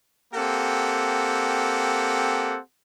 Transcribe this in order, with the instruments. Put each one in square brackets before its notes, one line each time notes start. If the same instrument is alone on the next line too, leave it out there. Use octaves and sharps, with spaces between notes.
[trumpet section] A#3 C4 G4 A4 F#5